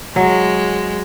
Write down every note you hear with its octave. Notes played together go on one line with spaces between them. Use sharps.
F#3 G#3